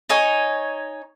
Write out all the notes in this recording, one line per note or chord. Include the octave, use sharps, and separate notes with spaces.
D#4 C#5 G#5